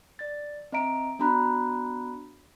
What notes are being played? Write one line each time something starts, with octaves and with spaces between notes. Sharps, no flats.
D5 A6
C4 D#5 E5 A#5 D7
B3 D4 F#4 A#5 B5 F#6